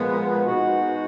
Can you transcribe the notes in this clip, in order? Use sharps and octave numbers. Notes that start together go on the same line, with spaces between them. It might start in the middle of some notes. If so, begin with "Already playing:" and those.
Already playing: A#2 F3 G#3 B3
B2 G#3 D#4 F#4